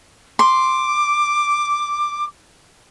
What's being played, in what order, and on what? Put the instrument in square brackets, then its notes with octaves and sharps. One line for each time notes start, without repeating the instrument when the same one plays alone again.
[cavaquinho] C6 [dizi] D6